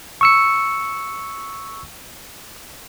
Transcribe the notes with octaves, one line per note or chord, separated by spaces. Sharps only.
C#6 E6 C#7